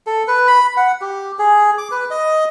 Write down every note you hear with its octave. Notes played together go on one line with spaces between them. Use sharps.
A4
B4
B5
F#5
G4
G#4
D6
B4
D#5